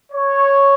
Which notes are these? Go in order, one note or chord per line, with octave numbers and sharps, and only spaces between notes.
C#5